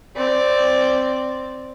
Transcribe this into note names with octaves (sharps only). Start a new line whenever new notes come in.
C4 D5